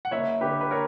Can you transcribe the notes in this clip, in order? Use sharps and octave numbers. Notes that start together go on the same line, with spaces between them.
F#5
F#1 C#5 E5
D3 G4 B4
B4
A#4 C#5